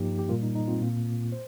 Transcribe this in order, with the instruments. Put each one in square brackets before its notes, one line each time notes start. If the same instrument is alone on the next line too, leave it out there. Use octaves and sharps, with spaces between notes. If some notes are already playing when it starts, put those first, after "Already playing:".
Already playing: [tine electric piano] G2 F3 A#3 D#4 G4
G4
A#2 G3 A#3 F4 A#4
D#4
D#4
C4 F4
A#2 A#3
C5